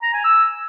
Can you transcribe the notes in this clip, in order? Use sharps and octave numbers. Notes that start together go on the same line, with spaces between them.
A#5
G#5
E6